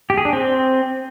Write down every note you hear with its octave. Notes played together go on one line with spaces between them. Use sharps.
G4
G#4
D4
C4